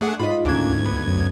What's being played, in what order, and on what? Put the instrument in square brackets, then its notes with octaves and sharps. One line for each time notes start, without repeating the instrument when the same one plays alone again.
[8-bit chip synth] A3 G#4 F#5 [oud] D4
[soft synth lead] G#2 [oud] F4 D#5 [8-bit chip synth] B5
[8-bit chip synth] D2 G#6 [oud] C#3 A#3 D4
[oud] B3
[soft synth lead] F#2